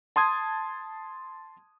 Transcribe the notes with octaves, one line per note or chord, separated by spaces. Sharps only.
A5 C6 D#6 G#6